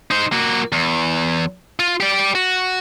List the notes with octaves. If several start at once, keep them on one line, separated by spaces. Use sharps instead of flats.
D#4 C5
A#3 F#4
E2
F4
G4 D5
F#4